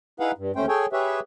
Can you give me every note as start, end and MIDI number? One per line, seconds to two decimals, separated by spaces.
0.20 0.31 63
0.20 0.31 64
0.20 0.31 68
0.20 0.31 71
0.20 0.31 77
0.20 0.31 78
0.38 0.52 43
0.56 0.66 39
0.56 0.66 57
0.56 0.66 61
0.56 0.66 72
0.56 0.66 79
0.69 0.86 68
0.69 0.86 69
0.69 0.86 73
0.69 0.86 79
0.69 0.86 80
0.93 1.20 67
0.93 1.20 68
0.93 1.20 71
0.93 1.20 73
0.93 1.20 76